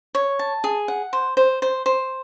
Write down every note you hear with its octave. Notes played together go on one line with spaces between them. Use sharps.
C#5
A5
G#4
F#5
C5
C5
C5
C5